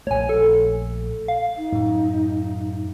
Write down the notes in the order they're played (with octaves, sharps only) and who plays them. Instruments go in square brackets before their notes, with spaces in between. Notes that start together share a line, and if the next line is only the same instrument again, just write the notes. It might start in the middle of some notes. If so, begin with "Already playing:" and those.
[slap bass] A#1 A3 [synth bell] C#5 G#5
[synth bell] A4
F5
[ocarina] D#4
[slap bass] F#2 A2